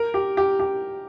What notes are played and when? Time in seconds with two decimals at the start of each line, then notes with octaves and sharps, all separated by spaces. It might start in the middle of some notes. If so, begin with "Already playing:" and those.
Already playing: A#4
0.14 G4
0.37 G4
0.60 G4